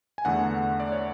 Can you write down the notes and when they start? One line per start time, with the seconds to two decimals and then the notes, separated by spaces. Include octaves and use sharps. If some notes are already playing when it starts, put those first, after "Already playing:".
0.18 G#5
0.25 E2 D3 A3 F#5
0.80 D5
0.92 C#5